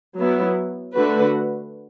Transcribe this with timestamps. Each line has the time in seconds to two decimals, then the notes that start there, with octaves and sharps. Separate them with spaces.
0.17 F#3 B3 E4
0.95 D3 A3 F#4 B4